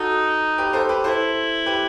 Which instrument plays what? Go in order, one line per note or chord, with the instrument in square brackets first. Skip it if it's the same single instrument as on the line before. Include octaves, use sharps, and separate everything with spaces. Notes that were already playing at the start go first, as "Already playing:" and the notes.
Already playing: [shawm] D#4 [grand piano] F#4 A4
[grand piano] G4 B4
A4 C5
G4 B4
[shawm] E4 [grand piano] A4 C5
[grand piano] G4 B4